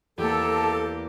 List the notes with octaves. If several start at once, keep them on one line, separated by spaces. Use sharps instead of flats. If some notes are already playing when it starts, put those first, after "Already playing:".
E2 A#3 G4 A4